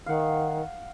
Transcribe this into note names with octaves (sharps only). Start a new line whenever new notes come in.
D#3 F5 F#5